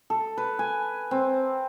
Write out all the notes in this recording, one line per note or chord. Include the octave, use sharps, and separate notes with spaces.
A4
B4
G#5
C4